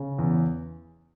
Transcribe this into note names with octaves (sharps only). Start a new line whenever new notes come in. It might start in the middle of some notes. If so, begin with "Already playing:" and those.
Already playing: C#3
E2